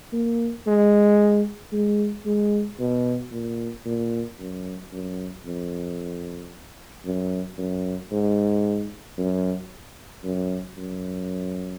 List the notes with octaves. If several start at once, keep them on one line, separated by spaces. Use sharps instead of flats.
A#3
G#3
G#3
G#3
B2
A#2
A#2
F#2
F#2
F2
F#2
F#2
G#2
F#2
F#2
F#2